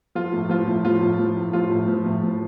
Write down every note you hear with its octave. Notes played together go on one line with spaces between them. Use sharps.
F3 F4
A2
F3 F4
A2
F3 F4
A2
F3
A2
F3 F4
A2
F3
A2
F3